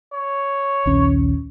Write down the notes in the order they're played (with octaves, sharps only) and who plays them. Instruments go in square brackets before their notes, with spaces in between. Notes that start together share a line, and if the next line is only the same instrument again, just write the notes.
[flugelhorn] C#5
[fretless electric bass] A#1 D#2 C#4